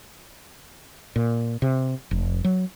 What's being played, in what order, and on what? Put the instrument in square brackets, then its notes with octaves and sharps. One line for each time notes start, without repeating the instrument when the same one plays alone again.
[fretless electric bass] A#2
C3
F1
F#3